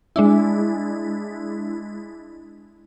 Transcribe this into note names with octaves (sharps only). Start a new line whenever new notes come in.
G#3 D4 E4